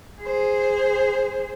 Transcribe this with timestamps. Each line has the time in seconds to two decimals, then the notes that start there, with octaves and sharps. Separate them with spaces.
0.21 G#4 C5